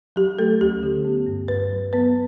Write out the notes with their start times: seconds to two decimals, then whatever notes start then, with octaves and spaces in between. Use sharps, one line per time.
0.16 F#3 G4
0.39 A3 A4
0.61 D2 G4
0.83 D3
1.05 B3
1.27 G2
1.48 G2 B4
1.71 F#3
1.93 B3 B4